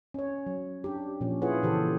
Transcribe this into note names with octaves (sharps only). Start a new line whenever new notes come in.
C#4 C#5
F#3
D4 G4
A#2 F3 C#4
E4 F4 G#4 B4 C#5 F#5
A#2 C#3 E3 G4 A4 C5